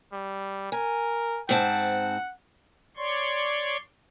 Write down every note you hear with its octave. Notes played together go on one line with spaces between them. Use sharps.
G3
A#4 G#5
G#2 C4 F#5 A5
C#5 D5 C6 C#6